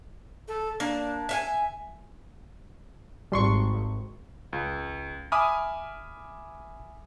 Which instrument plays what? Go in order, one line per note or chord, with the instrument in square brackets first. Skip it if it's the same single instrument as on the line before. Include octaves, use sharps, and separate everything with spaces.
[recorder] A4
[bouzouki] A#3 [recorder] D4
[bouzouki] E5 F5 G#5
[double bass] G#1 [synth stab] G3 C6 C#6
[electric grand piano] C#2
E5 G#5 B5 D6 D#6 F6